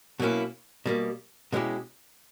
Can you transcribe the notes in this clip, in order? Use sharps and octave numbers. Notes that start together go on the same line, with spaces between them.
B2 F#3 A#3 C#4 E4
B2 G3 A#3
B2 G#3 C#4 E4 G4